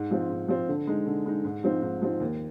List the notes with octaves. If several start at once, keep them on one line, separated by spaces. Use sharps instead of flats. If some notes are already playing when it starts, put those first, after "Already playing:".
Already playing: G#2
F3 C4
G#2
F3 C4
D3
G#3 D#4
D3
G#3 D#4
G#2
F3 C4 D#4
G#2
F3 C4 D#4
D#2